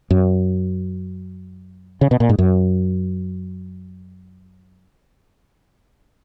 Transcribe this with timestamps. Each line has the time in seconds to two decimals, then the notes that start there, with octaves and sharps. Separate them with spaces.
0.10 F#2
2.01 C#3
2.11 B2
2.20 A#2
2.29 G#2
2.39 F#2